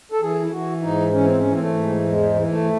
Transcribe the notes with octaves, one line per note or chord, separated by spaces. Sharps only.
A4
E3 G#4
E4
E3 F#4
G#2 D#4
E3 C#4
C4
C#4
E3
C4
A3
G#2
E2 G#3
E3
A3